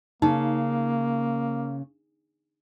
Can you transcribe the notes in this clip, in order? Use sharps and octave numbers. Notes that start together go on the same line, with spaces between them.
C#3 A#3 D#4